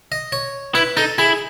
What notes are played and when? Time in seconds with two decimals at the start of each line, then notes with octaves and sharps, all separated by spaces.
0.12 D#5
0.32 C#5
0.75 E4 B4
0.97 D#4 A4
1.18 E4 G#4